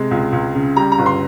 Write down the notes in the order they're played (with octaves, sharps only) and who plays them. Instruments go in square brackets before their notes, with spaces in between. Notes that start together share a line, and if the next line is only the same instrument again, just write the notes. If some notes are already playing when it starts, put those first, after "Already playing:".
Already playing: [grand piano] C3 G#3
C#2
C#2
C#3
G3 A#5
A#5
G1
C6